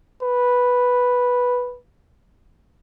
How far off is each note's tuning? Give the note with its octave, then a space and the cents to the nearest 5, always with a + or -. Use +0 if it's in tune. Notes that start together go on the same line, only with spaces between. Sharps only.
B4 -5